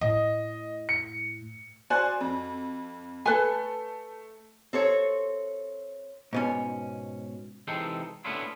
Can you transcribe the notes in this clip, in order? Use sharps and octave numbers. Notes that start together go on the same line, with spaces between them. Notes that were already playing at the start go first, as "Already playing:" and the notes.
A2 D#5
C#7
F#4 C5 D5 G#5
F2
A3 A4 B4 G#5
C4 A4 C#5
G#2 B2 C#4
C3 E3 G#3 D#4 A4 G5
A3 B3 C#4 D4 E4 F4